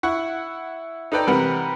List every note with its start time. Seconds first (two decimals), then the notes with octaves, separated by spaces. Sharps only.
0.03 E4 F#5 C#6
1.12 D#4 A4 B4 D5 G5 A#5
1.27 C3 E3 G3 A#4 B4 F#5